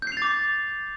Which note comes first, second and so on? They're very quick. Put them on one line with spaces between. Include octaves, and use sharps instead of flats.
G6 C7 F7 A6 D6